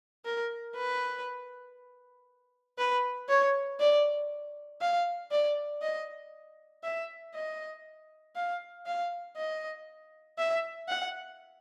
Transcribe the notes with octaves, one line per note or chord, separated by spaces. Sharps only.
A#4
B4
B4
C#5
D5
F5
D5
D#5
E5
D#5
F5
F5
D#5
E5
F#5